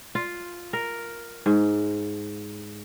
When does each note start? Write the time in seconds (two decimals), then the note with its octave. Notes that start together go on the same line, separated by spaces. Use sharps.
0.15 F4
0.73 A#4
1.46 G#2